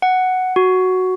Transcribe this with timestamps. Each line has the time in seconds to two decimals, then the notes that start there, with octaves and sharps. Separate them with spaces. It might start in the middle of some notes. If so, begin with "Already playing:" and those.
0.02 F#5
0.56 F#4